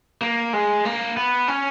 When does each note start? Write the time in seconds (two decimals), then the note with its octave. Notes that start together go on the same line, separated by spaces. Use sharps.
0.22 A#3
0.53 G#3
0.85 A#3
1.17 B3
1.48 C#4